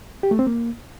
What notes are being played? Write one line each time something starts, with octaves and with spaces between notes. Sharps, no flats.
G4
A3
C4
A#3